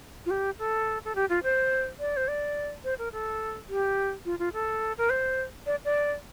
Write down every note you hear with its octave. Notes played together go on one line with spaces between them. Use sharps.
F4
G4
A4
A4
G4
F4
C5
D5
C5
D5
C5
A#4
A4
G4
F4
F4
A4
A#4
C5
D5
D5